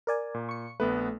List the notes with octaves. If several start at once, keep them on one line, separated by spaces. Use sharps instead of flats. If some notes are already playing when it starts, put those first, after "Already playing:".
A#4 D5 G#5
A#2
C#6 C#7
A#1 A3 B3 B4